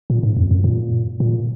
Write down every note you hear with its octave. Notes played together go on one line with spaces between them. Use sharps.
A#2
G#2
F2
F#2
A#2
A#2